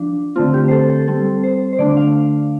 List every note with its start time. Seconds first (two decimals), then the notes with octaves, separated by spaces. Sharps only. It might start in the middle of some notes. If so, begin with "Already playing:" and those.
Already playing: F3 D4
0.36 D3 A3 C4 F4
0.54 G4
0.68 C5
0.71 A4
0.90 A4
1.07 G3 C4 A4
1.43 C5
1.72 C5
1.78 D3 A3 D4 D5
1.97 F5